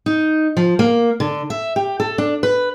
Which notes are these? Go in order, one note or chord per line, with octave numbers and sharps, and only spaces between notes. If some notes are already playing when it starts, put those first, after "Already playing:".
D#4
F3
A#3
D3
E5
G4
A4
D4
B4